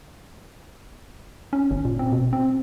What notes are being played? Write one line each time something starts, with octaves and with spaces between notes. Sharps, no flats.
C#4
G1
A#2
C4
B2
C4